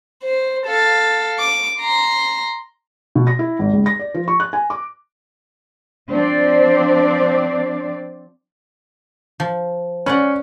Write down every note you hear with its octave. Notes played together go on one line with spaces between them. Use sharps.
C5
A4 F5
D6
A#5 C6
B2
A#6
E4
G#1
C#2
A#6
D5
F3
C#6
F#6
G#5
D6
F3 C4 D4 C5 D5
F3
C#4 B4 D5 F#5